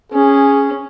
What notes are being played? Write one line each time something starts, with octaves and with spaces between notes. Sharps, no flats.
C#4 G#4